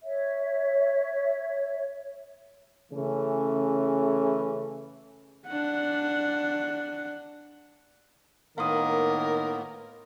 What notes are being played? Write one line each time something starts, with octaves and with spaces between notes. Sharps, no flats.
C#5 E5
C#3 E3 A3 C#4
D4 F#5
A2 D#3 A#3 B3 A#4 F5 C6 D#6